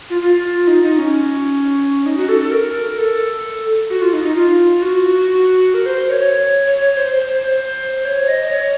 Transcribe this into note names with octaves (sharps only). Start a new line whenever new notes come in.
F4
F4
D#4
D#4
C#4
D#4
F#4
A4
A4
A#4
A4
F#4
F4
D#4
D#4
F4
F#4
A#4
C5
C#5
C#5
C#5
C#5
C5
C5
C#5
D#5
C#5